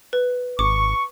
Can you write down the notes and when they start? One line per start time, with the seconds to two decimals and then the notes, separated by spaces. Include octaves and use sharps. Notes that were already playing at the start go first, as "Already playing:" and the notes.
0.13 B4
0.59 G#1 C#6 D6